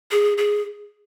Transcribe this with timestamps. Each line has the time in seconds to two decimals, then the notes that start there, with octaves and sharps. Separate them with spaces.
0.11 G#4
0.38 G#4